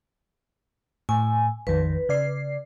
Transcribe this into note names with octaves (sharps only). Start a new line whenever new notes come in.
A2 G#5
A#1 F2 D#3 B4
C#3 D5 C7